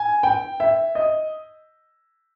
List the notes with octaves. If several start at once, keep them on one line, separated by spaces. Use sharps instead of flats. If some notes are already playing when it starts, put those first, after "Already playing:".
Already playing: G#5
G5
E5
D#5